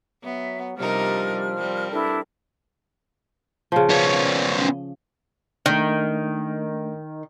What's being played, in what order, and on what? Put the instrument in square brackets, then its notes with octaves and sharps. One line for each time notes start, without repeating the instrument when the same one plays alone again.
[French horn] F#3 [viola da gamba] B3 [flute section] E5
[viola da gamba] C3 D#4 A#4 [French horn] F3 [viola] G3 D4 [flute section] F6
[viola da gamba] G3 [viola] C4 A#4
[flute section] D4 E4 B4 [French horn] A4
[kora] C#3 F3
[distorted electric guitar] B3 C#4
[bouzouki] D#3 [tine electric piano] A3 D4